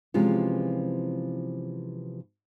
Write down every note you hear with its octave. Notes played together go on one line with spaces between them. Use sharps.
C3 E3 F3 G#3 C#4 F4